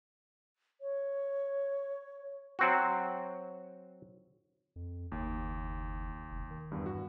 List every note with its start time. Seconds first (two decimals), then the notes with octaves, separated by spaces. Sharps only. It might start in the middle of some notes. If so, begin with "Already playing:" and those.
0.81 C#5
2.59 F#3 C4 F#4
4.76 F2
5.12 F#1 D#2
6.31 F1
6.51 D#3
6.72 E2 G2
6.86 G2 F#4